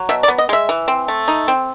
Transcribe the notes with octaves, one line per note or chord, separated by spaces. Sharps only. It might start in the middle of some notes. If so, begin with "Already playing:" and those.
Already playing: F#3
B2 E5
D5
B3
D#5
G#3 E5
E3
C4
A3
D#4
C4